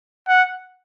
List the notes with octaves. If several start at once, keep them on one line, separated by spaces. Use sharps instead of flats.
F#5